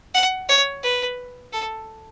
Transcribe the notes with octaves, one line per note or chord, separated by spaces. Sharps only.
F#5
C#5
B4
A4